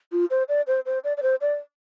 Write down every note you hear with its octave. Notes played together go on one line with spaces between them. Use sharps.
F4
C5
D5
C5
C5
D5
D5
C5
D5